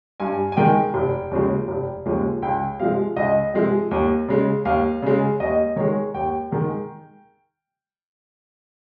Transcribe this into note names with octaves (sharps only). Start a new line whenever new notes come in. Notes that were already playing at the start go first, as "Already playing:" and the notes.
G2 G#5
G#5
D#3 G#3 G5
F1
D#2 C#3 F3 G#3
F1
D#2 C#3 F3 G#3
C#2 G5
C3 F3 G#3 F5
C#2 D#5
C3 F3 G#3
D#2
C#3 G#3
D#2 F5
C#3 G#3
D#2 D#5
D#3 G#3 C#5
D#2 G5
D#3 G#3